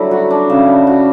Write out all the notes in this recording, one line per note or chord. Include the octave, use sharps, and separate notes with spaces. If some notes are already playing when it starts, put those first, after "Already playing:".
Already playing: D3 F#3 G3 A3 E4
F#4
D4
C#3
G3
F#4